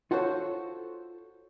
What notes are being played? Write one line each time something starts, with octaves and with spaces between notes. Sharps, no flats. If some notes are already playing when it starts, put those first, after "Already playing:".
F4 F#4 A4 C5 C#5